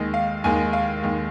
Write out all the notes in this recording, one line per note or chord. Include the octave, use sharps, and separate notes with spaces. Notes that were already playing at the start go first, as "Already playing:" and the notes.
Already playing: D#2 D#3 G#3 D#5
F5
D#2 D#3 G#3 G#5
F5
D#2 D#3 G#3